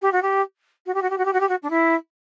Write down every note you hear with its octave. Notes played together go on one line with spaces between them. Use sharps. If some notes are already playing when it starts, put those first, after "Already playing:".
G4
F#4
G4
F#4
G4
F#4
G4
F#4
G4
F#4
G4
F#4
D4
E4